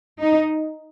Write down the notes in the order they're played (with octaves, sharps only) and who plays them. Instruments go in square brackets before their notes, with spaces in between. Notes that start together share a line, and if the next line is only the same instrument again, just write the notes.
[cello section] D#4